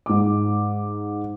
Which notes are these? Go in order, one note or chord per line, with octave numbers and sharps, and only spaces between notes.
G#2 D6